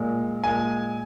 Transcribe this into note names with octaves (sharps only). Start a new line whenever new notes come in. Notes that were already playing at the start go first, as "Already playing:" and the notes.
Already playing: A#2 G#3
A#2 G#3 G#5